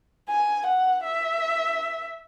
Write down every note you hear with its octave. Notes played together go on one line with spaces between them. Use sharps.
G#5
F#5
E5